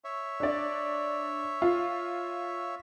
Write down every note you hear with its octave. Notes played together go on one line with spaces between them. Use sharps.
C#5 E5
D4 D5
F4